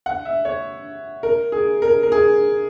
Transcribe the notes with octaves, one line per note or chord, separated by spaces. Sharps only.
F#5
E5
C#5
A#4
G#4
A#4
A#4
G#4